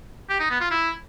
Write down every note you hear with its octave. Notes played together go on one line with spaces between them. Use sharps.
G4
D#4
B3
F4
E4